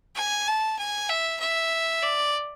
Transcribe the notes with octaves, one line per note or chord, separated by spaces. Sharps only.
G#5
A5
G#5
E5
E5
D5